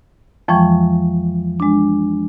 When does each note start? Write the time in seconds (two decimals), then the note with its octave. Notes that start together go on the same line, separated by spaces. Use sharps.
0.48 F2 E3 F3 G#3 G5 C#6
1.60 G#3 D4